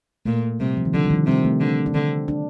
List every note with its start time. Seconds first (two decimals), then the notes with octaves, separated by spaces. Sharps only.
0.26 A#2 A3
0.60 C3 G3
0.77 F3
0.85 D#3
0.93 D3 F3
1.04 G3
1.10 D#3
1.15 F3
1.26 C3 G3
1.45 A3
1.60 D3
1.86 D4
1.94 D3 C4
2.28 D4